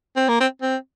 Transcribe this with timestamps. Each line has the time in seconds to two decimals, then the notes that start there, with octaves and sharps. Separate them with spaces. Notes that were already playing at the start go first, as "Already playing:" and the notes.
0.16 C4
0.28 A#3
0.41 C4
0.62 C4